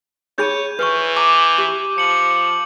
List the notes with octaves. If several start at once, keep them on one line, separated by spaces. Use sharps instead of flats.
D#4 G#4 C#5 B5 G6 D#7
E3 B4 C#6
A#5 D6 D#7
G4
F3 C#7 F#7